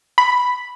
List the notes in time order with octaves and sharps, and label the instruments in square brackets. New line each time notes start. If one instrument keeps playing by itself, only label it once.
[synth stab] B5